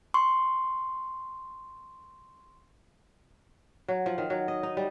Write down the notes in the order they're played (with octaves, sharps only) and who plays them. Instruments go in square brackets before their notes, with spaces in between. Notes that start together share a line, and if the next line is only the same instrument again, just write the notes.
[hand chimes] C6 C#6
[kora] F#3
F3
D#3
F#3
D#5
D#4
G3